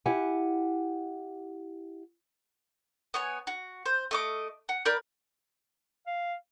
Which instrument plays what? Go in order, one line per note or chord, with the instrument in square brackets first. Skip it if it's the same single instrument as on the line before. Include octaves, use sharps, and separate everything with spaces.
[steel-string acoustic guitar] E4 G4 F#5 G#5
[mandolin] B3 C#5 G#5
F#4
C5
A3 D#5 D6
F#5
A#4 D5 B5 G6
[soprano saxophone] F5